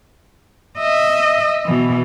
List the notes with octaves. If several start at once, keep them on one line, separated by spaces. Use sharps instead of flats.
D#5 E5
B2 E3